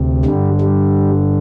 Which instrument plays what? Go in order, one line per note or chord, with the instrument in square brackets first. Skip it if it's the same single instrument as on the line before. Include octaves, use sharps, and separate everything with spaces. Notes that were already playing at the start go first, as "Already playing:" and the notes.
Already playing: [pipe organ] D2 C3
G2 D3 G3
G3